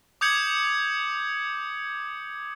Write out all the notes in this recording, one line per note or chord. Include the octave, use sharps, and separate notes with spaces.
D6 D#6 G6 G#6 C#7 F#7